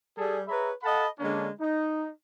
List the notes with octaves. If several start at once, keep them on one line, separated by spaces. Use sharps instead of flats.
G3 G#4 A4
G#4 B4 C#5 E5 A#5 B5
A4 D#5 F5 F#5 A5 B5
D3 G#3 A#3 C#4 D4
D#4